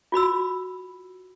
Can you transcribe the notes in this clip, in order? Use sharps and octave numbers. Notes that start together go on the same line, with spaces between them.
F4 F#4 B5 E6